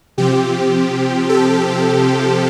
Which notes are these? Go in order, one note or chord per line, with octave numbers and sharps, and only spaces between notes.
C3 F3 C4 G4
A4